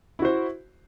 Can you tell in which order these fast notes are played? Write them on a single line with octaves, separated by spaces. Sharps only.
E4 F#4 C5